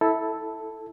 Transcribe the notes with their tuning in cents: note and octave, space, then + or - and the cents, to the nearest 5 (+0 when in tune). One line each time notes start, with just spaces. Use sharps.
E4 -15 A4 +0